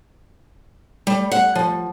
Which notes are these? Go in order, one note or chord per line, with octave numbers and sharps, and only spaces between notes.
G3
F#5
F3